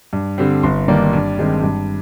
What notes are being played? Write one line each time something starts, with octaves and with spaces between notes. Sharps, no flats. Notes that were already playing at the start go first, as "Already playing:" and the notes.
G2
D3 G3 C4
G1 C6
G2 D#3 A#3 D5
G2
D#3 G#3 C4
G2